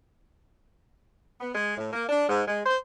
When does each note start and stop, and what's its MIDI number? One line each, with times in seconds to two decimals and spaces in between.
1.40 1.53 59
1.55 1.76 56
1.77 1.91 45
1.93 2.05 58
2.09 2.24 62
2.29 2.43 44
2.48 2.62 56
2.66 2.76 72